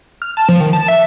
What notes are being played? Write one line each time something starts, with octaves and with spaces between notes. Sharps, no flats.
F6
A5
F3
D#3
A5
E5